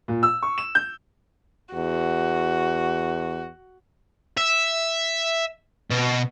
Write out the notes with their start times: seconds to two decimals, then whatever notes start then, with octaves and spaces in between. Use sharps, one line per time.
0.08 A#2
0.23 E6
0.43 C#6
0.58 E7
0.75 G6
1.74 E2 F#4
4.37 E5
5.91 B2